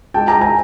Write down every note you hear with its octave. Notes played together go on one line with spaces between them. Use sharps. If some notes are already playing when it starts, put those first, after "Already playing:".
G#3 G5 A5
G#5 A#5
G#3
G#5 A#5